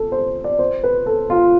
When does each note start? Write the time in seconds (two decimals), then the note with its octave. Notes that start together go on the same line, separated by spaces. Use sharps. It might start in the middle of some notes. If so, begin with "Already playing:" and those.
Already playing: A4
0.12 C5
0.44 D5
0.59 C5
0.83 B4
1.06 A4
1.30 F4